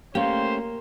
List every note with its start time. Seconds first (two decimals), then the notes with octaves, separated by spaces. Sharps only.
0.15 A3 A#3 C#4 G4 C5